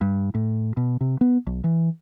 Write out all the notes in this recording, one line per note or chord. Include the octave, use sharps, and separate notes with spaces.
G2
A2
B2
C3
B3
B1
E3